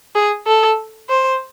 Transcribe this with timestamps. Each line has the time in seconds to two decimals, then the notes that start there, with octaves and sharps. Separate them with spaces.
0.15 G#4
0.47 A4
1.09 C5